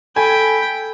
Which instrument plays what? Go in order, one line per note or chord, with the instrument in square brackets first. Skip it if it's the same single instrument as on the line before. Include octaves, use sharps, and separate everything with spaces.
[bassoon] A4 [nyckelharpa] G5 [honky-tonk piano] G#5 [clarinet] B5